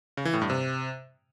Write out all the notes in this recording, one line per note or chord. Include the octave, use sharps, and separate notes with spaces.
C#3
E3
A2
G2
C3